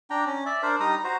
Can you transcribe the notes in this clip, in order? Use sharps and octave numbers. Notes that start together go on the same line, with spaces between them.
D4 G5 A#5
C#4
D5 E5
D4 A#4 C5
G3 D#4 A#5 D#6
F#4 C5 A#5